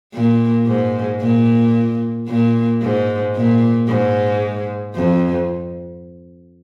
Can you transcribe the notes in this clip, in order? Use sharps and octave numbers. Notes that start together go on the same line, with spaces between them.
A#2
G#2
A#2
A#2
G#2
A#2
G#2
F2